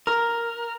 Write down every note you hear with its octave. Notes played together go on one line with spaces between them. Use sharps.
A#4